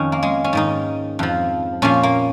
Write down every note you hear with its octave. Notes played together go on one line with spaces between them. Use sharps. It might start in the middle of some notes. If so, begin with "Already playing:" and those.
Already playing: F2 D#3 C#4
A#3
G#3
C#4
G#2 D#3 D#4
F2 F3
A#2 F3 C#4
A#3